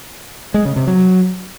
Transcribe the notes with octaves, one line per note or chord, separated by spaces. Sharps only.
G#3
C#3
C3
F#3